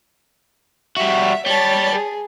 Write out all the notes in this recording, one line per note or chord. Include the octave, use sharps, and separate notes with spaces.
G3 F#4 E5
G3 C#5 A5
G#4